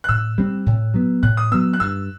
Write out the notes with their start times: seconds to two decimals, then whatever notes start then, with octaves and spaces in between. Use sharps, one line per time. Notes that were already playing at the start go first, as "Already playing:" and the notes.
0.04 F#6
0.09 A2 E6
0.38 G3 C4
0.66 A2
0.94 F#3 B3
1.23 A2 F#6
1.37 D#6
1.52 F#3 B3 E6
1.73 F#6
1.80 G2 E6